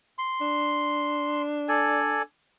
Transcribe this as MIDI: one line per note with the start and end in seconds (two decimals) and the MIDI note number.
0.18 1.42 84
0.41 2.22 62
1.68 2.22 69
1.68 2.22 74
1.68 2.22 80